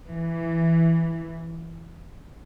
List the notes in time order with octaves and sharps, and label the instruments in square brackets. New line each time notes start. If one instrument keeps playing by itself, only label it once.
[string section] E3